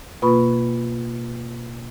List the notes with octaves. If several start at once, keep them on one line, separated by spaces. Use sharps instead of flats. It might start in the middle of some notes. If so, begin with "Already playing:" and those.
B2 A#3 F4 B4 B5 C#6